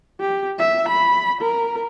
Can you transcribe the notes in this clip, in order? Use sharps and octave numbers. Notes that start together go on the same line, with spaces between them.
G4
E5
B5
A#4